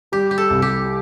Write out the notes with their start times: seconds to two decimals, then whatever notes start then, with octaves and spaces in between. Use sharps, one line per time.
0.12 G3 G4
0.31 G4
0.38 A4
0.50 C2
0.62 G4